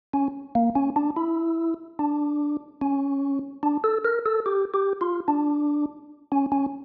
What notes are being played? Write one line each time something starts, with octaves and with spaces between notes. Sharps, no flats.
C#4
A#3
C#4
D4
E4
D4
C#4
D4
A4
A#4
A4
G4
G4
F4
D4
C#4
C#4